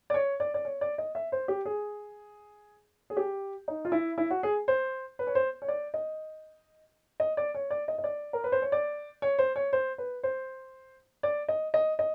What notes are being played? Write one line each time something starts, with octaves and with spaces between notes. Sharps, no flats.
D5
C#5
D5
D5
C#5
D5
D#5
E5
C5
G4
G#4
G#4
G4
D#4
F4
E4
E4
F#4
G#4
C5
B4
C#5
C5
C#5
D5
D#5
D#5
D5
C#5
D5
D#5
D#5
D5
A#4
B4
C5
C#5
D5
C#5
C5
C#5
C5
B4
C5
D5
D#5
D#5
D#5